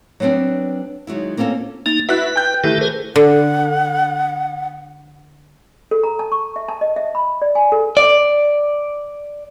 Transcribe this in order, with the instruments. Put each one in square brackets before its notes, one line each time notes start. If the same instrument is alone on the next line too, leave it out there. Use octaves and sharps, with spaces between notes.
[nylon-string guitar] F#3 G3 B3 C4 D4
D#3 F#3 G#3 E4
A#3 C4 C#4 F4 A4
[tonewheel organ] A#3 D#4 [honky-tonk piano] A6
[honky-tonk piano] E4 F#4 F#6 [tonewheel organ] B4
[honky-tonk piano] G5 G6
[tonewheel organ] D#3 G4 A4 [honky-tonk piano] E3 A3
[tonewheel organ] G#4 A#4 C5
[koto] D3 [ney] F#5
[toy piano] A4
A#5
A5
C#6
E5
A5
D#5
E5
B5
D5
G#5
A4
[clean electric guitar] D5